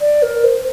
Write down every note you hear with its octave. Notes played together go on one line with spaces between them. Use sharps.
D5
A#4
C5